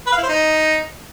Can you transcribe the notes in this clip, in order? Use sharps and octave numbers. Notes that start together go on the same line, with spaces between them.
B4
F5
E4
C5
D#4